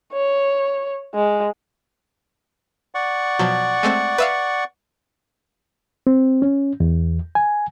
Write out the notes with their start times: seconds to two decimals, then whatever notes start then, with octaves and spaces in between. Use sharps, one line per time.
0.13 C#5
1.14 G#3
2.95 D5 F#5 C#6
3.39 B2 F3 F#3
3.83 G#3 A3 C4
4.18 B4 E5 F5
6.07 C4
6.42 C#4
6.80 E2
7.35 G#5